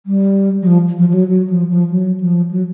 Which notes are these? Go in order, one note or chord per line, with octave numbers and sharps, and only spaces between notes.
G3
F#3
F3
F3
F3
F#3
F#3
F3
F3
F#3
F3
F#3